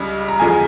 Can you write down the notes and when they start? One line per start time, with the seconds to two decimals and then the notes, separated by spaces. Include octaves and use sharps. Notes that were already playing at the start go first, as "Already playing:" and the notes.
Already playing: C#2 C#3 G3
0.28 A#5
0.40 E2 C#3 F3 G#3 G#5